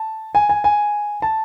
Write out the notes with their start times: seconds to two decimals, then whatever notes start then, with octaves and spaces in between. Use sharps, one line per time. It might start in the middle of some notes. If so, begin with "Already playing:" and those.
Already playing: A5
0.35 G#5
0.49 G#5
0.64 G#5
1.22 A5